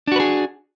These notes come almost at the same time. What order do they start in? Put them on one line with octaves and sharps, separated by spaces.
D4 F#4 B4 G#4